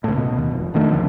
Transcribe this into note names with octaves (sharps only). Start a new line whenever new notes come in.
C#2 A2
B2
D#2
F1
F1 D#3 A3 D4
C#2 D3 F3